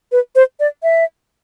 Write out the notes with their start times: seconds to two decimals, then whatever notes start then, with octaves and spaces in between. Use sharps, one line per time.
0.12 B4
0.36 C5
0.60 D5
0.83 E5